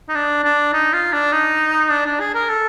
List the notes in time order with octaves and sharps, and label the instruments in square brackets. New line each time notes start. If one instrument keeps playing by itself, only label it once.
[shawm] D#4
D4
D4
D#4
F4
D4
D#4
D4
D4
G#4
A#4
A4